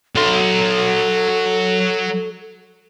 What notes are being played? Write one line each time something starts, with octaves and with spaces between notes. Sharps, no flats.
F#3 A4 C6